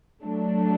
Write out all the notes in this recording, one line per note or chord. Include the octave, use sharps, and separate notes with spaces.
F#3 A3 D4